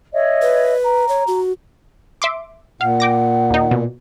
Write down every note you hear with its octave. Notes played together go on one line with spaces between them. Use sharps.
C#5 D#5 E5
B4
A#5
C#5
F#4
E5 C6 D6
A#2 F5 F#5
G5 D6 A#6
D#2 D#4
B2